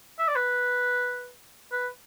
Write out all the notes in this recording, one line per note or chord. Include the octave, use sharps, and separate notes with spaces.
E5
D5
B4
B4